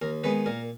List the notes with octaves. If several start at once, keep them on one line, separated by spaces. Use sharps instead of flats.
D#2 A#4
D#3 G#3 B3 B4
A#2 A#4